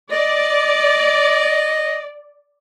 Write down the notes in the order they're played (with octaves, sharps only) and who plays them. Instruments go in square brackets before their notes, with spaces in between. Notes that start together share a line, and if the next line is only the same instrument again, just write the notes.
[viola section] D5 [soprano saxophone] D#5